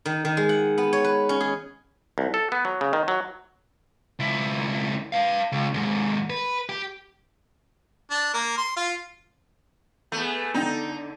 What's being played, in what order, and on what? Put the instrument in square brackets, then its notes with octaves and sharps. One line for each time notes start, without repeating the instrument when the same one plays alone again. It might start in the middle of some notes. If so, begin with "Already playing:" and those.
[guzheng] D#3
D#3
G#3
F#5
B3
C#5
B4
C#4
G#4
[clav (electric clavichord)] C2
A4
B3
F#3
C#3
D#3
F#3
[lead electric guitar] C#2 E4
B4 F5
C#2
D#2 G#2
B4
G4
[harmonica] D4
A#3
C6
F4
[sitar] A3 [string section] B3 G#4
[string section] D3 [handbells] B3 D4 G5 [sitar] D#4